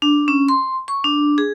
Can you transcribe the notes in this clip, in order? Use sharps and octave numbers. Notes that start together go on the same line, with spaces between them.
D4
C#4
C6
C#6
D4
G#4